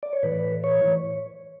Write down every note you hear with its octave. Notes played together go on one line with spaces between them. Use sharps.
D5
C#5
A2 E3 B4
C#5